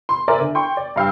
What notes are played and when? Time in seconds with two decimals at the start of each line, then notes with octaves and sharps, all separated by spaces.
0.09 C6
0.28 A#4 C5 D5 E5 G#5 A#5
0.40 D3
0.55 G5 C6 C#6
0.77 D5
0.96 G2 F5 G5 E6